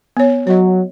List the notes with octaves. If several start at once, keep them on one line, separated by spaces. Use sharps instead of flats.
B3 C#5
F#3 C#5 D#5